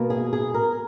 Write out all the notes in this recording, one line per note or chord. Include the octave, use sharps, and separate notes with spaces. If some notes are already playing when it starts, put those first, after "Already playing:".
Already playing: B2 A#3
G#4
G#4
A#4